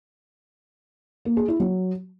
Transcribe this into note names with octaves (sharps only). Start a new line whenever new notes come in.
A#3
G#4
E4
F#3